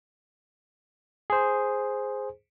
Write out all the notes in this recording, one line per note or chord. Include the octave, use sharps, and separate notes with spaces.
G#4 C5